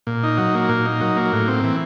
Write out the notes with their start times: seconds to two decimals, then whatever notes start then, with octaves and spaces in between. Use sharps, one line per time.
0.07 A#2
0.23 D#4
0.38 F#3
0.54 A#3
0.69 A#2
0.85 D#4
1.01 F#3
1.17 A#3
1.33 A2
1.48 C4
1.64 E3